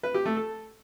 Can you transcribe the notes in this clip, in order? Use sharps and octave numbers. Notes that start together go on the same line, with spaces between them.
B4
G4
A3
A4